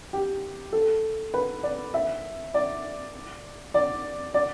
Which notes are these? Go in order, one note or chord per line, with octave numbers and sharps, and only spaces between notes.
G4
A4
B4
D5
E5
D5
D5
D5